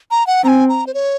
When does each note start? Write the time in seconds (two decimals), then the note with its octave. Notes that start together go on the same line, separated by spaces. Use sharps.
0.11 A#5
0.27 F#5
0.44 C4 A#5
0.48 G#5
0.69 A#5
0.87 C5
0.94 C#5